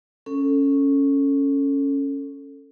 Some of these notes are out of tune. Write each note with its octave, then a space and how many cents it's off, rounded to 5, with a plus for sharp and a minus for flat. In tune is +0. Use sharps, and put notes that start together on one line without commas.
C#4 +0 A4 +15